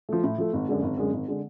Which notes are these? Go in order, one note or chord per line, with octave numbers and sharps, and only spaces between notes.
F3 A3
A2
F3 A3
G#1
F#2 D3 G#3
G#1
F#2 D3 G#3
G#1
D3 G#3